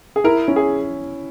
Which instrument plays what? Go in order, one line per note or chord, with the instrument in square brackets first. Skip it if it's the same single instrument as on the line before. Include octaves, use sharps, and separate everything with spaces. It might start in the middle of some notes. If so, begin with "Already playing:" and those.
[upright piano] G#4
[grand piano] E4 [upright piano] A#4
[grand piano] C#4
[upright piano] G#4